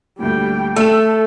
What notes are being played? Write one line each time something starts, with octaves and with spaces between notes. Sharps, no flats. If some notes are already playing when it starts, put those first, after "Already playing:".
D2 A#2 G3 G5
A3 A4 E6 E7